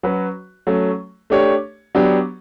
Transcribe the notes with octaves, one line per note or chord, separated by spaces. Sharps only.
F#3 C#4 F#4 B4
F#3 A3 C#4
A3 D4 G4 C#5
F#3 B3 D4 G4